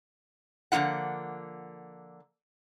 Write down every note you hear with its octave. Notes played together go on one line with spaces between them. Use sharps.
D3 F3 A#3 F4 F#5